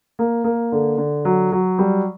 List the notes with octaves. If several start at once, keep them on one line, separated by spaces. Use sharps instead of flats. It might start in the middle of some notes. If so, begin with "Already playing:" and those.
A#3
A#3
D3
D3
F#3
F#3
G3